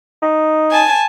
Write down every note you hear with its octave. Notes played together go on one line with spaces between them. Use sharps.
D#4
G#5 A5